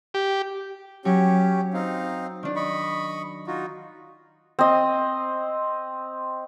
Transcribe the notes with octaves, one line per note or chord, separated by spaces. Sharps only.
G4
F#3 C#4 G4
C4 D#4 F5
D#3 D4
D#5 B5 C#6
D#4 F4 F#4
C4 D#5